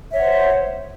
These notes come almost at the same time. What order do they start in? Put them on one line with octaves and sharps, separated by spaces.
E5 C#5 F#5 C5